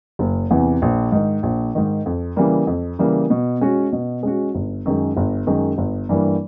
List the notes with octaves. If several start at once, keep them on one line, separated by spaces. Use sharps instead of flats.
F#1
E2 C3 E3
A#1
G#2 D#3
A#1
G#2 D#3
F2
C#3 E3 G3 A#3
F2
C#3 E3 G3 A#3
B2
G#3 C#4 F#4
B2
G#3 C#4 F#4
G1
F#2 D#3 G#3
G1
F#2 D#3 G#3
G1
G2 E3 G3 A#3